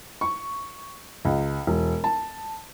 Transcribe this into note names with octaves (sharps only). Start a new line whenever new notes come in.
C#6
C#2
E1
A5